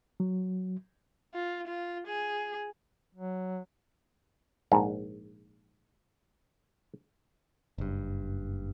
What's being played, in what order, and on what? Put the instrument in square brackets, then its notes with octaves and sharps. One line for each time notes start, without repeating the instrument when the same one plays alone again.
[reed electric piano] F#3
[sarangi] F4
F4
G#4
[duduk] F#3
[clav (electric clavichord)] A#1 G#2
[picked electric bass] F#1 G2